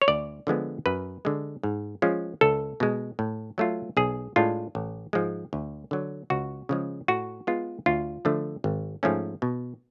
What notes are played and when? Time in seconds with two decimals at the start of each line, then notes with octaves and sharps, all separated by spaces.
0.02 C#5
0.08 D2 D5
0.47 D3 F3 G#3 B3
0.86 F#2 B4
1.25 D3 G#3
1.63 G#2
2.02 F3 G#3 C#4 F4
2.41 C#2 A4
2.80 B2 G#3
3.19 A2
3.58 F#3 A3 F4
3.97 B1 G#4
4.36 A2 G#3 D4 F4
4.75 A1
5.13 G#2 F3 G#3
5.53 D2
5.91 D3 F#3
6.30 C#2 F#4
6.69 C#3 F3 G#3
7.08 A2 F#4
7.47 G#3 B3 F4
7.86 D2 F4
8.25 D3 F3 A3
8.64 G#1
9.03 G#2 F3 A3 C#4
9.42 B2